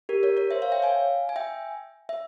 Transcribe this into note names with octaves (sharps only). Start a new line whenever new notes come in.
G4 A#4
A#4 C#5
A#4 C#5
C5 E5
C#5 F5
E5 G5
F5 G#5
G#5
E5 G5
E5